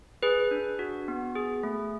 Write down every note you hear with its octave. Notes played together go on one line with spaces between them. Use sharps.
G#4 B4
D4
F#4
B3
G#4
A3